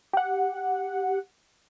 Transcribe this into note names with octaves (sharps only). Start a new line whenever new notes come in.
G4 F#5